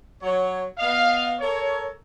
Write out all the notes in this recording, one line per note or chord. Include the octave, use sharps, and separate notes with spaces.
F#3 C#5
B3 D#5 F5
A4 A#4 C#5